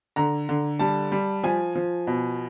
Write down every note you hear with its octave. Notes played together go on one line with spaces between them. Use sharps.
D3 A#5
D3
G3 A5
G3
F3 G#5
F3
B2